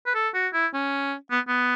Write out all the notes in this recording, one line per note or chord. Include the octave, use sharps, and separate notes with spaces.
B4
A4
F#4
E4
C#4
B3
B3